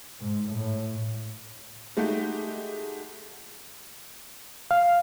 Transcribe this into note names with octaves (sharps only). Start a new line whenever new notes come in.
G#2
A2
G#3 A3 D#4 F#4 G4
F5